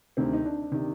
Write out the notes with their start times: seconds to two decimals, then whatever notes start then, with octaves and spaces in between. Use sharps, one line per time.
0.17 D2 C3 D#3 C4
0.33 D#4
0.45 D4
0.72 C3 D#3